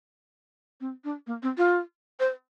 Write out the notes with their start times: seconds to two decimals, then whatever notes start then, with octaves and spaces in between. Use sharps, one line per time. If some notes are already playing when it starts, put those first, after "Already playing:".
0.81 C4
1.04 D4
1.27 A#3
1.43 C4
1.58 F4
2.20 C5